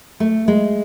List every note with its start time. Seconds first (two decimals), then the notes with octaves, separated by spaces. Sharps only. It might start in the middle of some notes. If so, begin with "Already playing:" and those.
0.20 A3
0.48 G#3